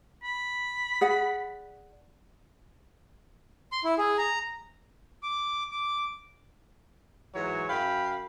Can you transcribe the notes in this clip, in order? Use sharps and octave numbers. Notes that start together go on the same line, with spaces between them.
B5
G#4 D5 F#5
C6
E4
G#4
A#5
D6
D6
G#2 E3 F#3 C#5
F#2 F5 G5 B5